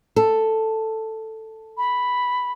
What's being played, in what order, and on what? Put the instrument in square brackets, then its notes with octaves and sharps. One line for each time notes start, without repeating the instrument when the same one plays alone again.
[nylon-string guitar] A4
[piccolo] B5